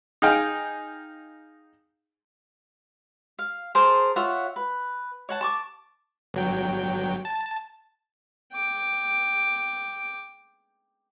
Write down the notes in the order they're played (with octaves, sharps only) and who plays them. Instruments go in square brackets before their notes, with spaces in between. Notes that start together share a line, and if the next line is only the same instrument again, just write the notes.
[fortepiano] D#4 G#4 F5 G5
[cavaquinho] F5
G#4 A#4 C5 A5
F4 C#5 E5 F#5
B4
C#5 F#5 A5
A5 C#6 D6
[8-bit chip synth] G1 F#3 G5
A5
[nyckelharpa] G5 D6